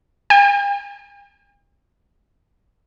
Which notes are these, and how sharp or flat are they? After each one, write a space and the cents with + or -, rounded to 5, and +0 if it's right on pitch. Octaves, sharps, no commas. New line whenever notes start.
G5 +45